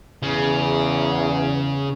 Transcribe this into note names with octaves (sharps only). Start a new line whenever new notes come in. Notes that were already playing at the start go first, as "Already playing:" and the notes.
E2 C#3